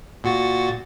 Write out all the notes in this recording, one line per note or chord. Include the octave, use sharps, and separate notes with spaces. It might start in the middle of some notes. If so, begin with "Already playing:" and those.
A#2 F#4 A6